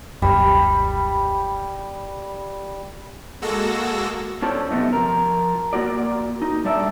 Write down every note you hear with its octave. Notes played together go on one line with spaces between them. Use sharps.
E1 C#2 F#2 G3
G#3 A#3 F#4 A4 E6 A#6
C#4 D4 F4 A4 C5 C#5
F#2 C3 A3 B3 D#4
F3 A#4
A#3 F4 F#4 D5
D#4
G3 A3 D4 D5 E5